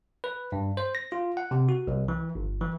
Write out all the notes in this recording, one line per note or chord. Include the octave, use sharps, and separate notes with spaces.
B4
G2
C5
A#6
F4
F#5
C3
F#4
C2
E3
G1
E3